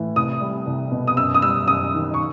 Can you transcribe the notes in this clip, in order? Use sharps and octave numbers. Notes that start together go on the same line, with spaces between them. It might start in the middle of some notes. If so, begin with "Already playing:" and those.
Already playing: A2 E3
C2 D#6
G3
C2
B2
D#6
F#2 E6
D#6
G3 E6
F#2 D#6
D#3
C#6